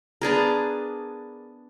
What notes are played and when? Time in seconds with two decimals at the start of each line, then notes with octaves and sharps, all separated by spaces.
0.22 B3 D4 G#4 A#4